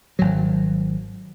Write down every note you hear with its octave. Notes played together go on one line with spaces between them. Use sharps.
G#1 F#3